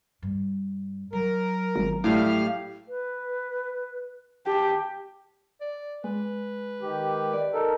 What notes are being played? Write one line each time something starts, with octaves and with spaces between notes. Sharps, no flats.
G2
F#3 A#4
G#1
A2 G3 F5 F6
B4
G4 A5
D5
G#3 B4
D#3 G4
D5
D#4 A4 A#4